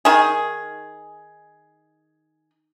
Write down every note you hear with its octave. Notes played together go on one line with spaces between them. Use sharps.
D#3 G#4